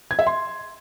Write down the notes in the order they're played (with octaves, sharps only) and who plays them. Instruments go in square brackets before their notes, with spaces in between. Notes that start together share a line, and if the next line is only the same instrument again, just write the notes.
[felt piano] G#6
E5
C6